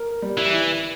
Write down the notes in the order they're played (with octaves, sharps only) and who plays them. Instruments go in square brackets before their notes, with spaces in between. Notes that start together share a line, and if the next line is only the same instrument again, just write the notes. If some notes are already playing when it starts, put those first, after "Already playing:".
Already playing: [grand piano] A#4
G3
[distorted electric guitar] E3
[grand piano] E4